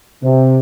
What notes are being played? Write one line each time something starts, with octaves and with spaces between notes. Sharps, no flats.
C3